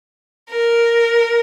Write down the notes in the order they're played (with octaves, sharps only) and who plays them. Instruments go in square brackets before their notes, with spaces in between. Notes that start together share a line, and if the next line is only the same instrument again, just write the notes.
[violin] A#4